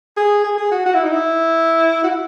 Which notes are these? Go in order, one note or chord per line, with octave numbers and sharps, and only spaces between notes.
G#4
G#4
G#4
F#4
F#4
E4
D#4
E4
F#4
E4